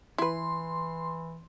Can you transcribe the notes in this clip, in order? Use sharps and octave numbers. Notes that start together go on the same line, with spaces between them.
E3 E4 B4 C6